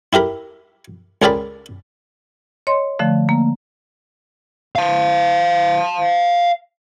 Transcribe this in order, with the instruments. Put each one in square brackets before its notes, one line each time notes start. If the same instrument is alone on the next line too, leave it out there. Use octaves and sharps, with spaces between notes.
[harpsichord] E4 G4 A#4 B5
C#2 G#4 A#4 D5 G5 B5
[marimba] C#5 D#5 C6
D3 F3 A3
A#3
[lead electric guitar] F5 A5